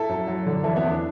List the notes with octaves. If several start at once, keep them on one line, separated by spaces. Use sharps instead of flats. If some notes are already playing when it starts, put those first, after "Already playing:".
Already playing: E4 A4
F#2
F#3
D3
E3 E4 A4
B3 E4
E2
D4